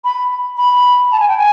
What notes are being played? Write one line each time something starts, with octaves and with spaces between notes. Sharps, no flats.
B5
B5
A5
G#5
G5
G#5